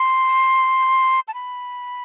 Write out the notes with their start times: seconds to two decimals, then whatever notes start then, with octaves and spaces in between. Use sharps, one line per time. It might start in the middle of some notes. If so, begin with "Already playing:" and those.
Already playing: C6
1.28 A5
1.34 B5